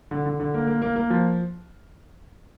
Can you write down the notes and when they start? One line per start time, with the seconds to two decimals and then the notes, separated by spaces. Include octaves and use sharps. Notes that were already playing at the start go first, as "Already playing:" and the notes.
0.11 D3
0.26 D3
0.40 D3
0.54 A#3
0.67 A#3
0.82 A#3
0.96 A#3
1.10 F3